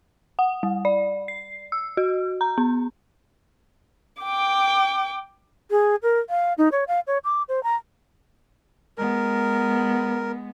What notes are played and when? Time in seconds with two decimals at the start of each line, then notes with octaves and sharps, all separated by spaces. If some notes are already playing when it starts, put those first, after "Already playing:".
0.39 F#5
0.63 G3
0.85 D5
1.28 C7
1.72 E6
1.97 F#4
2.41 A#5
2.58 B3
4.22 G5 D6
5.71 G#4
6.03 A#4
6.29 F5
6.58 D#4
6.72 C#5
6.88 F5
7.07 C#5
7.24 D6
7.49 C5
7.63 A#5
8.98 G#3 B3 A#4